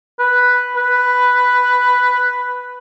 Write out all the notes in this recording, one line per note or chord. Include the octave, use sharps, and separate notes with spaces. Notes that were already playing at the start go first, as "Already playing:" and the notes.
B4
B4